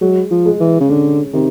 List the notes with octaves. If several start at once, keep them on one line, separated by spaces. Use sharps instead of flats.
F#3 G#3
F3
G#3
E3
C#3
D3 C#4
C3 D#3